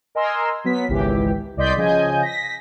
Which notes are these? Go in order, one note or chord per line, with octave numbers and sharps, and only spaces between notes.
A#4 D#5 G#5 A#5 C6 E6
F#3 B3 B6
G#1 C#2 E3 G4
C2 D5 D#5 C6 G6 B6
C#3 F3 D#5 G#5 G6
A#6 B6